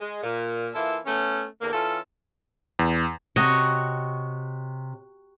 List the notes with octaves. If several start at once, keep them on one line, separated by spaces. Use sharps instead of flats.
G#3
A#2
E3 A#3 E4 F4 A4
A3 B3 C#4
E2 D3 A#3
E3 C#4 F4 A4
E2
C3 F#4 C#5 D#5